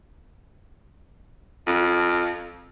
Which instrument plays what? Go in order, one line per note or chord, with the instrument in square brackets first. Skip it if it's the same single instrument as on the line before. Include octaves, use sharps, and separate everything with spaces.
[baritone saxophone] F2